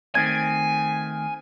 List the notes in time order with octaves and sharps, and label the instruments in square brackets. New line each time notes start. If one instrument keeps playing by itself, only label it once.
[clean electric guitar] D#3 A3 C4 [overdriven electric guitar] G#5 [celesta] G#6